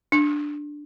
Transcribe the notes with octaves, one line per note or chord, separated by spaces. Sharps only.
D4